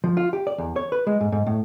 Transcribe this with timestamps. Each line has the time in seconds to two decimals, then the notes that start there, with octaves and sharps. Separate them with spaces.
0.04 F3
0.17 F4
0.33 G4
0.47 D5
0.58 E2
0.76 C#5
0.92 B4
1.07 G#3
1.21 G#2
1.32 G#2
1.47 A2